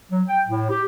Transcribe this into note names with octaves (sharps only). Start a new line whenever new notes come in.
F#3
G5
A2
G4